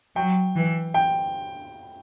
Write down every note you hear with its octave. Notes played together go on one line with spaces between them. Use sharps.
F#3 G5
E3
G5